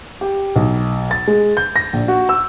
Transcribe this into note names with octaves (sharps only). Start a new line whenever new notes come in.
G4
B1
A6
G#3
G6
A#6
A#1
F#4
E6